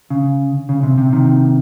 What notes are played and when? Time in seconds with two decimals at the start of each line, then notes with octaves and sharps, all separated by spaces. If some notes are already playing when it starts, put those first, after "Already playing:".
0.10 C#3
0.69 C#3
0.83 C3
0.98 C3
1.13 C3 D#3